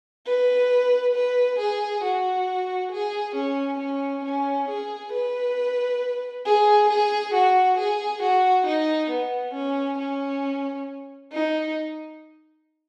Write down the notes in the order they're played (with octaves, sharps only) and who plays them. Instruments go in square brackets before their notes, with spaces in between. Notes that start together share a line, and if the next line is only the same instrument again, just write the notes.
[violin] B4
B4
G#4
F#4
G#4
C#4
C#4
C#4
G#4
B4
G#4
G#4
F#4
G#4
F#4
D#4
B3
C#4
C#4
D#4